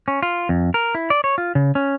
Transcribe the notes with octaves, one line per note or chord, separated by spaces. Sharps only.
C#4
F4
F2
A#4
E4
D5
C#5
F4
C#3
C#4